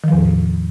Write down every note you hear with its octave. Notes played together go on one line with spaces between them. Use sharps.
E2 A2 D#3 F3